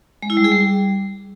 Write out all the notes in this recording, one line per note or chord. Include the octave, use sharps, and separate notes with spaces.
G#3
E4
G3
G#4
G3